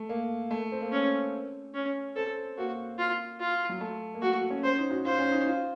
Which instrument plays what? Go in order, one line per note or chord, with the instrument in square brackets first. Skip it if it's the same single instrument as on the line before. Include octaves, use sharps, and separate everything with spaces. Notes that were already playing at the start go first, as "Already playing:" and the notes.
Already playing: [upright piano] A3
A#3
A3
C4
A#3
[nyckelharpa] C#4
C#4
[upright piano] C4 [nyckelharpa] A4
[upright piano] A#3 [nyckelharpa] F#4
[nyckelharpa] F4
F4
[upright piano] F#3
A3
A#3
[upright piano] A3 [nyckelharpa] F#4
[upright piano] C#4
[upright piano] C#4 [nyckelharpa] C5
[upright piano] D#4
F#4
[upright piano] F4 [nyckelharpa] C5
[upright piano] C#4
D#4
F4